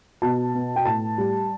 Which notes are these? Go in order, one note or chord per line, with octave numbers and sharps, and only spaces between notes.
B2 A5
B3
G5
A2 A5
G3